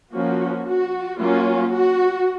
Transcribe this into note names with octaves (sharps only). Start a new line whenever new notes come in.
F3 A#3 C#4 F#4
F#4
F#3 A#3 C#4 F4
F#4